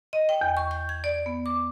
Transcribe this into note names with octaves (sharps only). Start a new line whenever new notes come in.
D#5
G5
E2
C#6
G6
G#6
D5
B3
D6